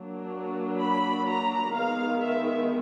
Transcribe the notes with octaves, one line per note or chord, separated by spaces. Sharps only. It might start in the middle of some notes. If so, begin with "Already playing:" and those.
Already playing: F#3 A#3 D4
B5
A#5
D#3 G#3 B3 F5
E5